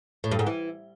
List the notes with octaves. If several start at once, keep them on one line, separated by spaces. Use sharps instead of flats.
A2
G2
G#2
E3